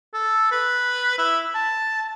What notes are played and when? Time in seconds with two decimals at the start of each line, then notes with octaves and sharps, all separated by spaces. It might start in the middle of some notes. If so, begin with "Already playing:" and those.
0.13 A4
0.51 B4
1.18 E4
1.54 A5